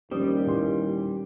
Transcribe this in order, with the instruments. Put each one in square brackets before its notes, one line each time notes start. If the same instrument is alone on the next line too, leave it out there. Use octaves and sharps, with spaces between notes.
[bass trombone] D#2 [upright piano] F3 [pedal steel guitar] G3 [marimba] A3 C#4 D#6
[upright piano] A#2 E3 C6